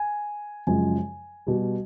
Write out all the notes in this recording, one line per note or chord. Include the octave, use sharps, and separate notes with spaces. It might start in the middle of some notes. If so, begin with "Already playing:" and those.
Already playing: G#5
F#2 C#3 F3 G#3 G#5
B2 G3